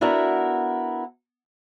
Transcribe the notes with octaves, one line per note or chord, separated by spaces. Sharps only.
B3 D4 E4 F#4 A#4